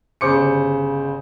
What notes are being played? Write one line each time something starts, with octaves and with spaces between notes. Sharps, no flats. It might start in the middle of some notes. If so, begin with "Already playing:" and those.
G1 C#3 C5 D6 C#7